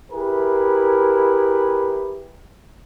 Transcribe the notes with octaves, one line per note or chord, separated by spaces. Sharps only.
E4 G4 G#4 A#4 B4